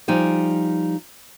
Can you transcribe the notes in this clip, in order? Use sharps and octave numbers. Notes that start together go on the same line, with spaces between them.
F3 G3 D#4 G5 G#5